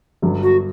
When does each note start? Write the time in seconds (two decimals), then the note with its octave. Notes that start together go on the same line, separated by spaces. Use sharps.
0.22 G1 G2 F#3
0.43 F#4